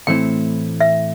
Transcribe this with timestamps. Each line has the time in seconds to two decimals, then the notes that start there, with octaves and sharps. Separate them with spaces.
0.07 A2 E3 A3 C4 E4 G5
0.81 E5